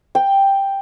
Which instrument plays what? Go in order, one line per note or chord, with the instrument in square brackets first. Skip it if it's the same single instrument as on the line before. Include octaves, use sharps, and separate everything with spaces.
[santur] G5